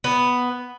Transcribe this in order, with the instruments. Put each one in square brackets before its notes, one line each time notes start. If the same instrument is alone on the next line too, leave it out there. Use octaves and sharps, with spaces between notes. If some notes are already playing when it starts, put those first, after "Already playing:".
[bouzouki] B3